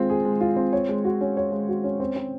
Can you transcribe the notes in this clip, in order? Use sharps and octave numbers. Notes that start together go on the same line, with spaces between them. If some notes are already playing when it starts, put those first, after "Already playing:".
Already playing: G#3 C4 F4
G#4
G#3
F4
C4
C#5
G#3
F#4
C#4
C#5
G#3
F#4
C#4
C4
C4